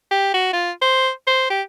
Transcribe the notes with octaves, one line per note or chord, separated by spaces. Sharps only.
G4
F#4
F4
C5
C5
G4